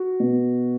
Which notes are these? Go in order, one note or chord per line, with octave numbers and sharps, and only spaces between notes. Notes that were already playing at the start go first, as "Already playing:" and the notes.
Already playing: F#4
B2